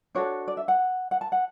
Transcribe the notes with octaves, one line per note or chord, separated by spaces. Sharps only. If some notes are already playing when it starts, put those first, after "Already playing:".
D4 F#4 A4 C#5
D5
E5
F#5
F#5
A5
F#5